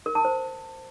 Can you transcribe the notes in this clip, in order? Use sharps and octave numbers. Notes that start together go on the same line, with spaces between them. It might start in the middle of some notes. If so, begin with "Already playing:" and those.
A#4
A5
C5